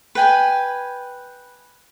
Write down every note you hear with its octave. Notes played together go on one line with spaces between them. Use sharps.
B4 G5 G#5